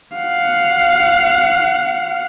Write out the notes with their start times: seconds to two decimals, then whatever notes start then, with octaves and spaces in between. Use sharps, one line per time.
0.16 F5 F#5